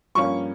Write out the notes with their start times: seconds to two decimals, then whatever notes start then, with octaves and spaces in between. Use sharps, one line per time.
0.15 G2 F3 A#3 C#4 C#6